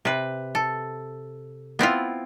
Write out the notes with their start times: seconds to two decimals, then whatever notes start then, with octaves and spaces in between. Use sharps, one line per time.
0.05 C3 B4
0.55 A4
1.79 B3 C4 E4 F4